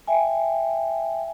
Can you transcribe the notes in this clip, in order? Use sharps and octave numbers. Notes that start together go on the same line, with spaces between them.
E5 G5 G#5